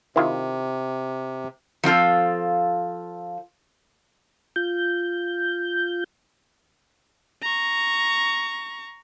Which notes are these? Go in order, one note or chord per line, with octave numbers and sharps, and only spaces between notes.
C3 D#3 E4 F4
F3 C4 F4 A4
F4 G6
A#5 C#6